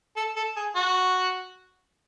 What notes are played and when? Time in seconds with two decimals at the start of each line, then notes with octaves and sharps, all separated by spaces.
0.16 A4
0.36 A4
0.56 G#4
0.76 F#4